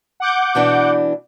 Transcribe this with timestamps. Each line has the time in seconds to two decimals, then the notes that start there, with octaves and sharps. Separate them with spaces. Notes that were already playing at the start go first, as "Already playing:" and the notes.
0.20 F#5 D6 G6
0.55 B2 E3 D4